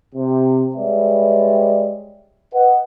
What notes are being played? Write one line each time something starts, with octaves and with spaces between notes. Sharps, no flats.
C3
G3 G#3 B4 C#5 D5 E5
B4 D#5 F#5